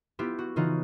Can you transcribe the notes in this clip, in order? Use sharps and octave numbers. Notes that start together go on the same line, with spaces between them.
B3 E4 F4 G4
F#4
C#3 E3 D#4 F4 F#4